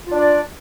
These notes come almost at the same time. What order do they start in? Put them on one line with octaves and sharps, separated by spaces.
F4 D4 D5